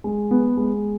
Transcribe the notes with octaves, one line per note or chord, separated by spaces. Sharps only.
G#3
B3
G#3